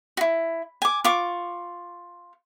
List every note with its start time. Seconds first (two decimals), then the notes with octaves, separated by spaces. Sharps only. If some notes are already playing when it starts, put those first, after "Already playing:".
0.17 E4 F#4
0.82 G#5 D6
1.04 F4 C#6 D6